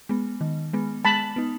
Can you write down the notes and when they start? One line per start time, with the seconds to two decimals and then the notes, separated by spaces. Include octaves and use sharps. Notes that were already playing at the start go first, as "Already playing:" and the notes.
0.09 G#3 B3
0.41 D#3
0.73 G#3 B3
1.05 G#3 A5 B5
1.36 B3 D#4